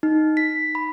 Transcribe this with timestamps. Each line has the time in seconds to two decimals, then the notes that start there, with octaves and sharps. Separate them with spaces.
0.03 D#4
0.37 B6
0.75 B5